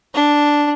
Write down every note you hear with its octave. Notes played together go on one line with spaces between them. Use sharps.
D4